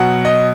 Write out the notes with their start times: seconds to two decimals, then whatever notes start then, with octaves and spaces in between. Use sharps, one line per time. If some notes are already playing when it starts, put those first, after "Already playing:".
Already playing: B2 F#3 F#5
0.25 D#5